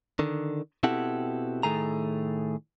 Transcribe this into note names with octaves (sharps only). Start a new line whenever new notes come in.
D3 D#3
B2 C4 E4 G4 A4 F#5
A2 D#3 A3 G#4 A#5